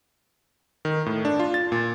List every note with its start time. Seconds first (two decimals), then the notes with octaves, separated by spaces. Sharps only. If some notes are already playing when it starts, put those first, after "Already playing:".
0.85 D#3
1.06 A2
1.25 D4
1.39 F4
1.54 A6
1.72 A#2